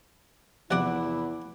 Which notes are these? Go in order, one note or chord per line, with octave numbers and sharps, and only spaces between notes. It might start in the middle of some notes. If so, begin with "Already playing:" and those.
E2 C3 F3 E4 D5 F#5